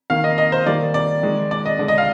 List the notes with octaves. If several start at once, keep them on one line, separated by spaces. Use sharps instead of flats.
D#3 A#3 F5
D#5
D#5
C5
D#3 G3 A#3 D5
D5
D#3 G#3
D5
D#5
D3 G#3 D5
D#5
F5